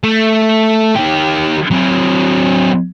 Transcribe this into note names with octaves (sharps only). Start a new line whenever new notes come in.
A3
D#3 G4
F#3 C4